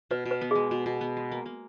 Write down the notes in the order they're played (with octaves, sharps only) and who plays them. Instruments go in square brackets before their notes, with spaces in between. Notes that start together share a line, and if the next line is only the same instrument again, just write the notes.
[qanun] B2 [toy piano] B4
[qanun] B2
[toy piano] B4
[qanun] B3
[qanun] G#3 [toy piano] G#4
[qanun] B2
B2
B3
G#3
A#3
A#3